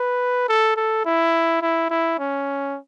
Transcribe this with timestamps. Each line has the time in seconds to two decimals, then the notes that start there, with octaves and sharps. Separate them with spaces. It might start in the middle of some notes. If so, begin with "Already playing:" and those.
Already playing: B4
0.49 A4
0.77 A4
1.05 E4
1.62 E4
1.90 E4
2.19 C#4